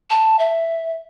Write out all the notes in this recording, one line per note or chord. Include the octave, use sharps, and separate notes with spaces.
A5
E5